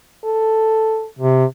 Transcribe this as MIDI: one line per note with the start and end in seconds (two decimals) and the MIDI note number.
0.25 1.07 69
1.19 1.45 48